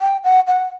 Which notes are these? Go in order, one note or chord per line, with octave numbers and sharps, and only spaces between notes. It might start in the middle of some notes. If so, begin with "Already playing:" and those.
G5
F#5
F#5